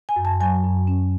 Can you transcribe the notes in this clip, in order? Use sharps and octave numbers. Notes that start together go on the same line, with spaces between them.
G#5
F#2
A5
F#3 G#5
F#2
C#4